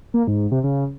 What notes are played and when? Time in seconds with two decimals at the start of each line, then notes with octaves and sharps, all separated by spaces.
0.14 A#3
0.27 G#2
0.52 C3
0.64 C#3